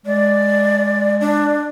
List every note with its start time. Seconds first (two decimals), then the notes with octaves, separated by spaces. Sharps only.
0.06 G#3 D5
1.20 D4